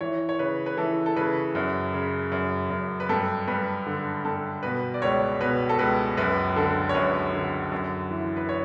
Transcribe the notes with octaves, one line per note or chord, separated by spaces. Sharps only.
E3 C#5
C#5
C#3 B4
B4
E3 A4
A4
C#3 B4
F#2
C#3
F#2
F#2
B4
G2 A4
G2 B4
D3
G2 A4
B2 B4
D5
C#2 C#5
B2 B4
A4
C#2 B4
F#2 B4
D3 A4
C#5
F#2 B4
D3
F#2
E3
B4
C#5